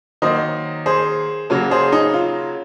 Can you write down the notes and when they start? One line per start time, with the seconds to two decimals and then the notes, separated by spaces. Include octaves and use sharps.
0.22 D#3 F#3 A#3 C5 D#5
0.86 G#4 C5
1.50 C#3 F#3 A#3
1.71 G#4 C5
1.92 D#4
2.14 F4